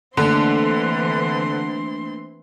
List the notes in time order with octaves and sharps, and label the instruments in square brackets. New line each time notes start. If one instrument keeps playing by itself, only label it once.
[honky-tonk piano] D3 [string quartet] E3 C4 C6 [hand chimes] A3 A#3 D4